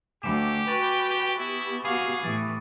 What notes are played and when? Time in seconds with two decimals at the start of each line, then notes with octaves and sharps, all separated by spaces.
0.23 D2 G4 G#5 D6 E7
0.68 F#4 B4 G5 C#6 A6
1.10 G4
1.39 B3 E4 G4
1.85 F#4 G#4 F5 B5 D6 D#7
2.22 A2 E3 D#6 A6